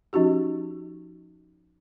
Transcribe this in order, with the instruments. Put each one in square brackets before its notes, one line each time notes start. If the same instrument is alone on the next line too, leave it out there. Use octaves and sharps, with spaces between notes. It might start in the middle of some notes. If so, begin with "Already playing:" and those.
[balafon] F3 C#4 D#4 F#4 G4